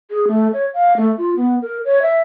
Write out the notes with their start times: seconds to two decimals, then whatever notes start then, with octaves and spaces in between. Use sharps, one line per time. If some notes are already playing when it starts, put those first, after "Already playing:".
0.11 G#4
0.28 A3
0.53 C#5
0.74 F5
0.97 A3
1.18 F4
1.36 B3
1.62 A#4
1.85 C#5
2.02 E5